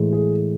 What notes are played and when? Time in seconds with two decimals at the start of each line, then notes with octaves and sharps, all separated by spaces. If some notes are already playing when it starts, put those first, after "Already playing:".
Already playing: A2 E3 G#3
0.13 G#4